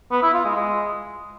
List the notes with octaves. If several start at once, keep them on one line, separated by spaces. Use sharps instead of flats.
B3
E4
F4
G#3
G#3